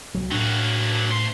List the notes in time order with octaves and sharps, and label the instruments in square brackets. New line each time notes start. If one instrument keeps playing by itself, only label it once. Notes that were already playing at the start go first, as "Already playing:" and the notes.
[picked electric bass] C2 F#3
[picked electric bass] A2 D4 [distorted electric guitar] F#3 A#3
[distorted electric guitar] D2 C6